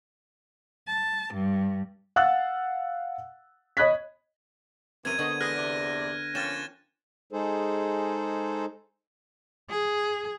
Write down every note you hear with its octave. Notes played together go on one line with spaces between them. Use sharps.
A5
G2
F5 F#5 E6 F#6 A6
C#5 D#5 B5 F#6 G#6 B6
F#2 C3 E3 C4 A#4 G#6 D#7
D3 B3 C4 C#5 D#5
E3 G#3 G#4 B4 F6 F#6 A#6
E2 C3 D5
F3 A#3 C#4 G5 F6 A6 E7
G#3 D#4 G#4 A4 C5
G#4